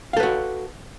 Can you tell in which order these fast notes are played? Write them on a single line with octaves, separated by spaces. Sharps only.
F5 A4 B4 F#4